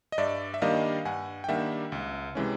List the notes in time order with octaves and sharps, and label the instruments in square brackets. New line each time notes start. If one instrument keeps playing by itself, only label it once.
[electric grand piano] D#5
G2 D5 E5
E5
D#3 G3 A#3 D4 D#5 F5
G2 F#5 G#5
G5
D#3 G3 A#3 D4 E5 F#5
C#2
C3 E3 G#3 C#4